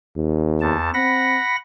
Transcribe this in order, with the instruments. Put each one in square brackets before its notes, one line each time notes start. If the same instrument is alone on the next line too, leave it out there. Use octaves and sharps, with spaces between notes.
[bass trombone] D#2
[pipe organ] E2 A5
[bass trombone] C4 [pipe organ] F#5 B5 A#6